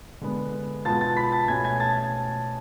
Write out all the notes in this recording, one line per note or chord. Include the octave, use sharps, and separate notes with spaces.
D3 G#3 B3
B2 G#3 B3 F4 A5 A6
A5 A6
B5 B6
A5 A6
B2 A3 C#4 G#5 G#6
G#5 G#6
A5 A6